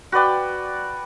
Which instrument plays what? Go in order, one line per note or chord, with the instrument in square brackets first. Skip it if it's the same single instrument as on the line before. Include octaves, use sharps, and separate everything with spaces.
[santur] F#4 B4 D5 G5